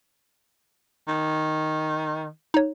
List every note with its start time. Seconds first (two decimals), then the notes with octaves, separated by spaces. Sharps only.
1.08 D#3
2.54 D#4 C#5